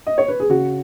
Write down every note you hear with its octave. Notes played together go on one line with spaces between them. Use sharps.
D#5
C#5
B4
G#4
C#3 F#4